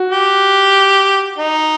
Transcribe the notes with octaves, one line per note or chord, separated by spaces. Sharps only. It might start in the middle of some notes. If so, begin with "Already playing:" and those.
Already playing: F#4
G4
D#4